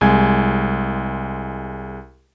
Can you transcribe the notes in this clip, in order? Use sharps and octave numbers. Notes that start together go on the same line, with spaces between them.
C2 G#3 G#5 G#6